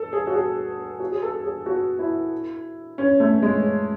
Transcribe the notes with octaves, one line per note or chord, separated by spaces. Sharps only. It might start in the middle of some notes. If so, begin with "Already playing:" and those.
Already playing: A4
G#4
F#4
G#4
F#4
G#4
A4
G#4
F#4
E4
C#4
A3
G#3